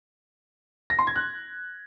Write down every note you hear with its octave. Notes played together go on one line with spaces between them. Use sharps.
A#6
C6
G#6
F#6